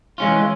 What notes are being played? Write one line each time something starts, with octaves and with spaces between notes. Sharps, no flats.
E3 G#3 C#4 F4